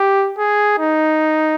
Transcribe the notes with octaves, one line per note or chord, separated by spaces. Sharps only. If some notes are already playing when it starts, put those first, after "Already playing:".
Already playing: G4
G#4
D#4